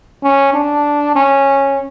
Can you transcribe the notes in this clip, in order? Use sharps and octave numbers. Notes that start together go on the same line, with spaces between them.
C#4
D4
C#4